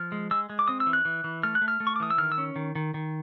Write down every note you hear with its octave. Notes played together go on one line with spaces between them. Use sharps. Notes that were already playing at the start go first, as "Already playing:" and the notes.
Already playing: F3 F6
G#3
G#3 E6
G#3
D6
C4 D#6
E6
E3
F#6
E3
E3
A3 F6
F#6
A3
F6
A3
C#6
D6
E3 D#6
E6
D#3 F6
E6
C#4
D#3
D#3
D#3